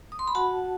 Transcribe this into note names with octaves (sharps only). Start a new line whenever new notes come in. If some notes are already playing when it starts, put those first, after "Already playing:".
D#6
C6
B5
F#4 F#5 A5